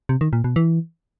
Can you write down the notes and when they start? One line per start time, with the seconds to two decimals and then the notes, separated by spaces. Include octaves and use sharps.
0.09 C3
0.21 D#3
0.33 A#2
0.44 B2
0.56 E3